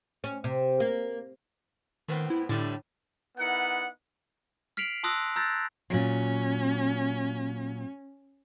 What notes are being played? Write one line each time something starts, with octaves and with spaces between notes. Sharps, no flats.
C#4
C3
A#3
A2 D#3 B3 C4
E4
A2 D3 G3 A3
B3 D#4 E4 A#4 F#5
F6 B6 C7 D7 F7 F#7
A5 C6 D#6 E6 F#6 A#6
A#5 E6 F#6 G6 A6 A#6
A#2 F#3 C#4